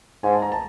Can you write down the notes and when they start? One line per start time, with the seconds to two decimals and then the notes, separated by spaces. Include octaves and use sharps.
0.23 G#2 G#5
0.33 A5
0.42 A#5
0.52 A5